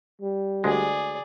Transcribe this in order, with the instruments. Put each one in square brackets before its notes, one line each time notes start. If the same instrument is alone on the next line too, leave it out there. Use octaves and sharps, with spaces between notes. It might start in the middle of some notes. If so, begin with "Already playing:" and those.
[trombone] G3
[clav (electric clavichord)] D2 G#3 [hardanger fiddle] G#4 D5